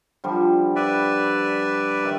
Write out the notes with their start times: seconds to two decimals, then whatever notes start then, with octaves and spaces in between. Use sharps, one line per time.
0.24 D3 F3 G3
0.76 B4 D5 E5
2.03 D#3 E4 A#4